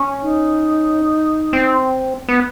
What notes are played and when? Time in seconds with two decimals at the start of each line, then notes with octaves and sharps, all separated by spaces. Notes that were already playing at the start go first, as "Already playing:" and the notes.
Already playing: C#4
0.22 D#4
1.53 C4
2.29 B3